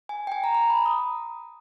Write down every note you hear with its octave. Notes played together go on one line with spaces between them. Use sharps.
G#5
G5
G#5
A#5
A#5
B5
D#6